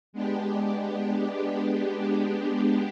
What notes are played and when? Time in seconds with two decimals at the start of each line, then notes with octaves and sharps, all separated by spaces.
0.13 G#3 B3 D4 G4